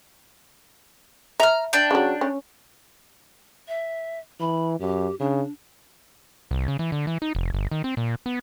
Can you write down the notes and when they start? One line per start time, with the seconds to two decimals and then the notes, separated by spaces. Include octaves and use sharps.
1.40 E5 A#5 F6
1.73 D4 G5
1.91 C#3 F#3
2.21 C#4
3.68 E5
4.40 E3 B5
4.80 F#2 G4
5.20 C#3 D4
6.51 C2
6.68 C#3
6.79 E3
6.92 D3
7.07 E3
7.22 D#4
7.35 F1
7.54 G1
7.71 D#3
7.84 C4
7.97 A#2
8.26 B3